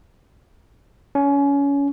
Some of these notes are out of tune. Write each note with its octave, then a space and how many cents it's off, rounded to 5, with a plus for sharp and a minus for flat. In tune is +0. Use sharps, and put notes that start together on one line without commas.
C#4 +25